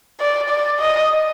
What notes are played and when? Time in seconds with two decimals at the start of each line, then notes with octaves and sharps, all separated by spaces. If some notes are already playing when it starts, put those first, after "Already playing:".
0.20 D5
0.50 D5
0.80 D#5